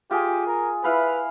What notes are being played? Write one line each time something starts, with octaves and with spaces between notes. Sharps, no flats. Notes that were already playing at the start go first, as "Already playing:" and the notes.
F4 G4 G#4 G#5
A#4
E4 B4 F5 B5